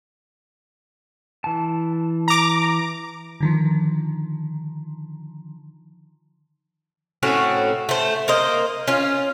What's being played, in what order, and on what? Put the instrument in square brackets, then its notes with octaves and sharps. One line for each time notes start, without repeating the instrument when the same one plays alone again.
[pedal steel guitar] E3 A5
[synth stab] A#5 D6
[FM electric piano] D3 D#3 F3
[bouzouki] A2 C4 C#4 F#4
A3 C5
A#3 A#4 C5 D#5
C#4 F4